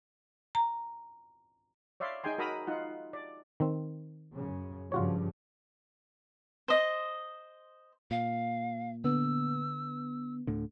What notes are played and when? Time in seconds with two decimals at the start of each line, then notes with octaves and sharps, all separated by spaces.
0.55 A#5
2.00 C#5 D5 E5 F5 C6
2.24 D#4 G#4 G5 G#5 C6
2.38 F#4 A#4 A#5 B5 D#6 E6
2.67 D#4 F4 F#5
3.13 D5
3.60 D#3 C4
4.35 F#2 C#3
4.92 G2 C#3 F3 F4 F#4 C#5
6.68 C5 D#5
8.11 A#2 F5
9.04 D3 B3 E6
10.47 D2 A2 D3